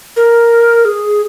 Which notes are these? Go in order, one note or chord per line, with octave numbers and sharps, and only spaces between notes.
A#4
G#4